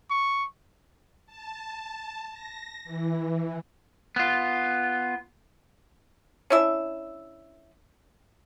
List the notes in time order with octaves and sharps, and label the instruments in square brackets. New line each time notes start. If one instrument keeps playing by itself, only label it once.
[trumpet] C#6
[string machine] A5
A#6
E3
[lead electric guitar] B3 F4
[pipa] C#4 D4 E4 E5